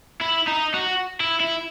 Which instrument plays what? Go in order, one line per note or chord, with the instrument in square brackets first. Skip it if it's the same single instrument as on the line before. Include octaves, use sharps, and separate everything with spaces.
[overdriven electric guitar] E4
D#4
F#4
E4
E4